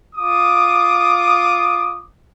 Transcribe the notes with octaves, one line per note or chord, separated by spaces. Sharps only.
F4 D6 D#6